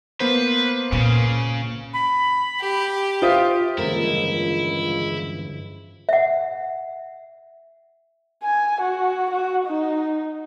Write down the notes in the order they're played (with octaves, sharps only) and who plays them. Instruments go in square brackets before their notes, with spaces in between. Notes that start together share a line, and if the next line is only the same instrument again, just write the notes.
[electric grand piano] A#3 B3 C5 [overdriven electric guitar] B4
[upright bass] A#2 [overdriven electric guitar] C#3
[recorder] B5
[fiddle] G4
[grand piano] F4 C5 D#6 [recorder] E5
[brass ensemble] C#2 [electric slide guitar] G2 D3 E3 [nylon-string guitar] F3 A#3 A#4 [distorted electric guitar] E4
[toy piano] E5 F#5
[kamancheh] G#5
F#4
F#4
D#4